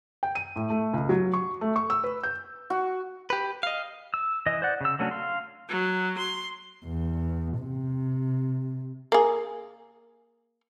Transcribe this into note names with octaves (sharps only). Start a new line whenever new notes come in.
G5
D#7
A2
A3
C#2
F#3
C#6
A3
C#6
E6
B4
G6
F#4
G4 B4
D#5 F5
E6
E3 D#5
C5 D5 F#5
C#3 E6
F#3 A3 C#4 D4 F#4
F5 C6
F#3
C6
E2
C3
A#3 G#4